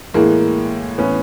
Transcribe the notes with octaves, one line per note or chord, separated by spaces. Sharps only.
A2 E3 G#3 A#3
A2 E3 B3 C#4